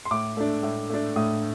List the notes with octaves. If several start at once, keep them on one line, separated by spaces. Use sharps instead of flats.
C6
A2 D6
A3 D4
A2
A3 D4
A2 D#6